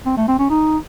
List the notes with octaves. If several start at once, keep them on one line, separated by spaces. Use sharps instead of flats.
C4
A3
C4
C#4
D#4